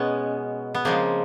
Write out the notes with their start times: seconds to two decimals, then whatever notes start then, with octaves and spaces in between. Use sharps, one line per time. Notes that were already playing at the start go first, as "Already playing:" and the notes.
Already playing: B2 G#3 B3 C#4
0.74 B3
0.85 C#3 F3 G#3 A#3 C4